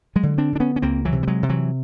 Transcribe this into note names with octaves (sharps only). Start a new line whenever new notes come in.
F#3 G#3
D3
C4 D4
D3 D4
B3 C#4
C#4
C#2 A#3 C4
E3 F#3
C3
G3
F#3 G#3
C3
E3 F#3